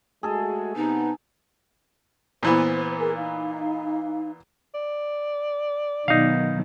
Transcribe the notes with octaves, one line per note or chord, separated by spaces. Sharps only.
G#3 A3 F#4 G#4 A4
C3 B3 D#4
A#2 E3 B3 C5
G#4 A#4 G#5
D#4 F5
D5
B2 D#3 F#3 D#4 F5